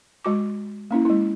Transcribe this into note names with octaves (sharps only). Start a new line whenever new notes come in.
G#3 F#4 D6
A#3 C#4 E4
G#3 E4